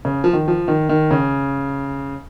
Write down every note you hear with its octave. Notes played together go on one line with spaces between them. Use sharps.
C#3
F3
D#3
F3
D#3
D#3
C#3